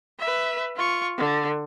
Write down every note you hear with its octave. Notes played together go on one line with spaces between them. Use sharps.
B4 E5
F4 C#6
D3